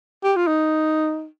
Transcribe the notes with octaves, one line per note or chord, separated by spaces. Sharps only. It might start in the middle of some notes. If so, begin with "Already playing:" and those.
G4
F4
D#4